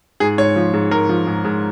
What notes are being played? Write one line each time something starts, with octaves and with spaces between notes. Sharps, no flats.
G#2 G#4
G#2 C#5
F3
G#2
G#2 A#4
F3
G#2
G#2